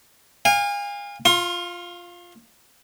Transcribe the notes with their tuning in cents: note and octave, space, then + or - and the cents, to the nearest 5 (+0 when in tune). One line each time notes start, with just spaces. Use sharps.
F5 +10 G#5 -35
F4 +0 C6 +45